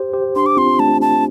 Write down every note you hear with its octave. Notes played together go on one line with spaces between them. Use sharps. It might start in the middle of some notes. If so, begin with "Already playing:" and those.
Already playing: G4 C5
G4 C5
D4 G4 C6
D6
C4 F4 C6
A3 D4 A5
A5